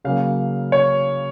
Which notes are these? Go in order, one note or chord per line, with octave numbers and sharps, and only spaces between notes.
C#3 F#3 A#3 F5
C#5